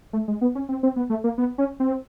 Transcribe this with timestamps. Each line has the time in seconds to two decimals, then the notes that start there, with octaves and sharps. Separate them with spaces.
0.13 A3
0.28 G#3
0.41 B3
0.55 C#4
0.69 C4
0.83 C4
0.96 B3
1.10 A3
1.24 A#3
1.38 B3
1.58 C#4
1.80 C4